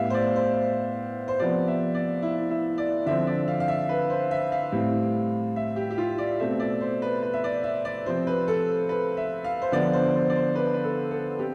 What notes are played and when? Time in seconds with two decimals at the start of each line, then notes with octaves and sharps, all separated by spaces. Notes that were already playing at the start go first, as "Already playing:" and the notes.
Already playing: A2 G3 B3 E5 F5
0.10 C5
0.14 D5
0.36 C5
1.28 C5
1.39 C3 F3 B3 D5
1.68 E5
1.95 D5
2.22 E4
2.50 E4
2.78 D5
3.06 D3 F3 C4 E5
3.27 D5
3.48 F5
3.60 F5
3.68 E5
3.89 B4
4.10 C5
4.31 E5
4.52 F5
4.72 A2 G3 C4
5.56 E5
5.76 G4
5.91 G4
5.98 F4
6.18 D5
6.39 B2 A3 C4 E5
6.60 D5
6.81 C5
7.02 B4
7.23 B4
7.34 E5
7.44 D5
7.64 E5
7.85 D5
8.06 C3 F3 C4 C5
8.27 B4
8.48 A4
8.89 B4
9.17 E5
9.44 F5
9.62 C5
9.72 D3 F3 B3 D5
9.93 C5
10.14 C5
10.30 D5
10.36 C5
10.55 B4
10.74 B4
10.84 A4
11.11 A4
11.39 C4 G4